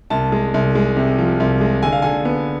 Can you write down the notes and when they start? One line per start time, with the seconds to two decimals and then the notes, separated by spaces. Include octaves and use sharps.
0.10 C2 A5
0.32 G#3
0.54 C2
0.75 G#3
0.97 C3
1.18 F3
1.40 C2
1.61 G#3
1.83 D3 G#5
1.92 F5
2.02 D3 G#5
2.25 B3